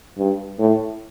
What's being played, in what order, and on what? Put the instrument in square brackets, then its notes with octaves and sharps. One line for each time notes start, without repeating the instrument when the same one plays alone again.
[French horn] G2
A2